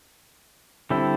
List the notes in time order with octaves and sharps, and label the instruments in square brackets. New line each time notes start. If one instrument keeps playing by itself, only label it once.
[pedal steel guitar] D3 G3 C4 E4 A4